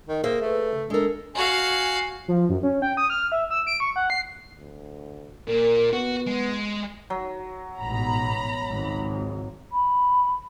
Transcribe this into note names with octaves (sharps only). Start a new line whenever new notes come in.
D#3
A#3 G#4 C5 E5
A3 B4
C#3
G#3 D4 A4 A#4
F#4 F5 G#5
F3
F#2
C#4
G5
D#6
F6
E5
E6
D7
C#6
F#5
C7
D2
A#2 A#4
B3 F#4
G#3
F#3
A1 G#2 B2 A#5 B5
G#1 C#2
B5